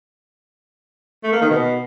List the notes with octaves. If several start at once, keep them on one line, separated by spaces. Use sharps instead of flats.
A3
A#3
D#3
B2